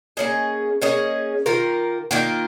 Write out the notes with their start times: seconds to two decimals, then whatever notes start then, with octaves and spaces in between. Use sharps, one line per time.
0.17 A#3 C#4 G#4 D#5
0.82 A#3 C#4 G#4 D#5
1.46 D#3 A#3 F4 A#4
2.11 D#3 A#3 F4 A#4